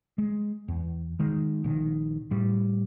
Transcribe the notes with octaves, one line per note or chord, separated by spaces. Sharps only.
G#3
E2
D#3 G#3
A#1 D#3
A2 G3